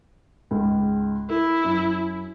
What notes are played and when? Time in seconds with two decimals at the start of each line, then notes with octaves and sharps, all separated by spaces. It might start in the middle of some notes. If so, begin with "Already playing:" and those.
0.51 C#2 G#2
1.30 E4 A#4
1.65 F#2